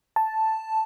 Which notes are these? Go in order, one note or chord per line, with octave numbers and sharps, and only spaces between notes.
A5